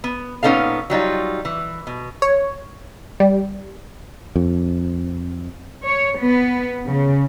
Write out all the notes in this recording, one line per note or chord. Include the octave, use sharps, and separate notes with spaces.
B3
A#2 B3 C#4 D#4 A4 F5
F#3 G3 D#4 F4
E3
B2
C#5
G3
F2
C#5
B3
C#3